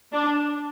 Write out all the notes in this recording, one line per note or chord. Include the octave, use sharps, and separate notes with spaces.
D4